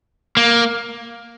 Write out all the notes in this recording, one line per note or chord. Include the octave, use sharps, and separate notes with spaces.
A#3